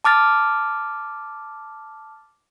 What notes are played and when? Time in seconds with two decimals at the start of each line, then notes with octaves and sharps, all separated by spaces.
0.04 A5 D6 F6 A6